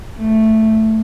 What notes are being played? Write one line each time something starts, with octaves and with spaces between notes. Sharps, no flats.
A3